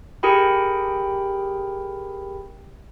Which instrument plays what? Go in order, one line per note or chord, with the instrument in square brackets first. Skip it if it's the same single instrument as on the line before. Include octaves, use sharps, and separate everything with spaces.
[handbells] G4 G#4 A#4 G5 B5